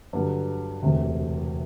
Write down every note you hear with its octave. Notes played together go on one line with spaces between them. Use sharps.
G2 D3 F#3
E1 D2 C3